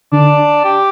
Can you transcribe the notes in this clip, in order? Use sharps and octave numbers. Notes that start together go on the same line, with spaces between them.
D3 D4
G4